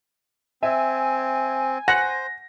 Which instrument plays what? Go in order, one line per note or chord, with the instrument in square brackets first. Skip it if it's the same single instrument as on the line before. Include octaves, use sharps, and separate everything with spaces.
[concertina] C4 [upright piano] E5 [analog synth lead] G#5
[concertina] C5 [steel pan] F#5 [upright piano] A#6